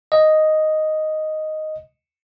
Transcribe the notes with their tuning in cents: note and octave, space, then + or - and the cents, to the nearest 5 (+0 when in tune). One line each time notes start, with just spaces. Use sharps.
D#5 +0